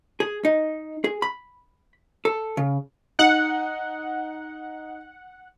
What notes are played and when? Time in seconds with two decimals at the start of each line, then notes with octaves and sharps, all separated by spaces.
0.20 G#4
0.45 D#4
1.04 G#4
1.22 B5
2.25 A4
2.57 C#3
3.19 D#4 F#5